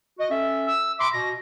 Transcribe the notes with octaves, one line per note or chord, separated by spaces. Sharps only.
F#4 D#5
C#4 A4 E5
E6
E5 B5 C6 D6
B2 A#6